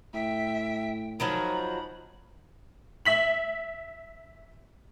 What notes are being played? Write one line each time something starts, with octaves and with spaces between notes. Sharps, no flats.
A2 E5 G5
D#3 F3 F#3 A#5 B5
E5 B6 F#7